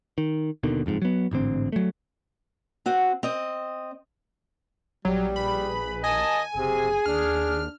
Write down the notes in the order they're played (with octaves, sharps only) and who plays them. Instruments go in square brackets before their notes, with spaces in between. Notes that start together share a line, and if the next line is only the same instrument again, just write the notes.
[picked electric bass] D#3
D#2 B2 D3 D#3
F#1 F2 G#2
F#3 B3
A1 G#2 D3 C4
F#3 A3
[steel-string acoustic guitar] C4 F#4
C4 D#5
[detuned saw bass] A#1 [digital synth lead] F#3 [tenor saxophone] G3
[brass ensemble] G#4 B4 [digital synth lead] B5
[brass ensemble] D#2 A#4 A5 [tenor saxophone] D#5 [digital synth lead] G#5
[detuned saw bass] F#1 [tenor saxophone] C3 [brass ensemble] G#4
[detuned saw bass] D#2 [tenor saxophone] D4 [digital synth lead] F6